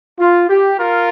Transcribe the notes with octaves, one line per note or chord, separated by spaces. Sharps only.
F4
G4
F4 A#4